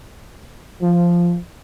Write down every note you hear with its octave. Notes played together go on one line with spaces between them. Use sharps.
F3